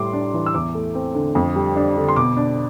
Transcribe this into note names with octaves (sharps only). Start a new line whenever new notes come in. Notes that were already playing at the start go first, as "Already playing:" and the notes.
Already playing: A2 G3 C6 D6
D4
E3
E6
E2 D6
A3
C4
D3
F2
G3
D4
D3
C6
B2 D6
D4